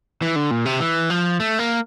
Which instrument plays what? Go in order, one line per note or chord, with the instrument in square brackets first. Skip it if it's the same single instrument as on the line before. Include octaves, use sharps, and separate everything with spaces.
[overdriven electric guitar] E3
D3
A#2
C3
E3
F3
A3
A#3